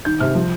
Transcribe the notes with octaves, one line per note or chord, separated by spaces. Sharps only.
D#3 G6
C3 F6
F3